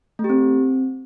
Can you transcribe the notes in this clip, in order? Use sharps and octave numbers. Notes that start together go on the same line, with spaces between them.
A3
G4
C4